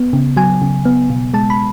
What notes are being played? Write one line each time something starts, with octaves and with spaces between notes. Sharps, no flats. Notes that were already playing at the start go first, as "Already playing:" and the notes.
Already playing: B3
C#3
F#3 G#5
C#3
B3
B2
G#3 A5
B5